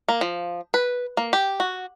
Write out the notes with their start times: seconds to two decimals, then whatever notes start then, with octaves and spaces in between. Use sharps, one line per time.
0.08 A#3
0.21 F3
0.74 B4
1.17 A#3
1.33 G4
1.60 F#4